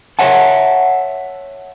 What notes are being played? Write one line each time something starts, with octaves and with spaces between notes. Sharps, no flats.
C#5 E5 F#5 A5